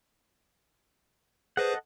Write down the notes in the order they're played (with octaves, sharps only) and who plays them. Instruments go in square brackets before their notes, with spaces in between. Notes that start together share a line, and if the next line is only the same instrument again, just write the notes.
[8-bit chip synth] G#4 B4 C5 [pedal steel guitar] A4 D#5 F#5